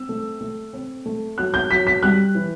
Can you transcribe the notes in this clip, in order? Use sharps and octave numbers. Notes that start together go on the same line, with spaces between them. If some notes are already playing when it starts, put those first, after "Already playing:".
Already playing: C4 E6
A3
A3
C4
A3
F#3 F#6
G6
F#3 B6
B6
G3 F#6
E3